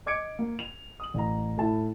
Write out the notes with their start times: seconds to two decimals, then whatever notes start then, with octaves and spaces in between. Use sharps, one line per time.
0.06 D#5 D6 G#6 C#7 D7
0.39 A#3
0.59 F7
1.00 D#6 F#7
1.14 A1 A#5
1.58 A2 E4 A5